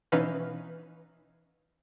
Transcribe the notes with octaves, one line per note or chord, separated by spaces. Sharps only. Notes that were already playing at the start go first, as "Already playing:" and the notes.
B2 E3 C#4 D#4 B4 F5